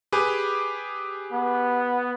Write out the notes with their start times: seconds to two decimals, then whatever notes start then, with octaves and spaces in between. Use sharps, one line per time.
0.12 G4 G#4 B4
1.33 B3